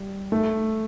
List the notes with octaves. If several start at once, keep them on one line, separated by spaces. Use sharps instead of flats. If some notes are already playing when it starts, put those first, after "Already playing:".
Already playing: G3
A3